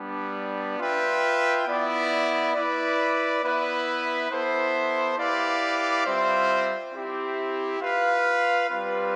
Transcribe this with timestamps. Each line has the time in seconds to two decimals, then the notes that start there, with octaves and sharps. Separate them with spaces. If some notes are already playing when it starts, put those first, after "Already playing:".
Already playing: G3 B3 D4
0.79 F4 B4 E5 G5
1.66 B3 E4 B4 D5
2.54 E4 B4 D5
3.42 B3 E4 B4 E5
4.29 B3 E4 A4 C5
5.17 E4 G4 B4 D5 F5
6.05 G3 C4 F4 C5 E5
6.93 C4 E4 G4
7.81 F4 B4 F5
8.67 G3 C4 F4 B4